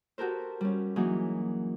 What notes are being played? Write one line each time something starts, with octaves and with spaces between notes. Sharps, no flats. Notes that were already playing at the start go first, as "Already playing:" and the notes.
F#4 G4 A4 A#4 C5
G3 C#4
E3 F#3 A#3 D#4 G#4